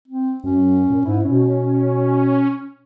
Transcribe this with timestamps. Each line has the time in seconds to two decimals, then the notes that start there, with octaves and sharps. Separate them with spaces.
0.08 C4
0.44 F#2 C#4
0.90 A#2
1.05 G#2 E4
1.25 B2 C#4